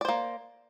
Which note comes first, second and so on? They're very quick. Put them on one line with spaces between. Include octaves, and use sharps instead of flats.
D5 C5 A#3